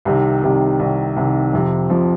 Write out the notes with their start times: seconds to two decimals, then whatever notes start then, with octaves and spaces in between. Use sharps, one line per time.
0.05 C2 C3 D#3
0.43 C2 C3 D#3
0.79 C2 C3 D#3
1.16 C2 C3 D#3
1.53 F2 C3 F3
1.90 F2 C3 F3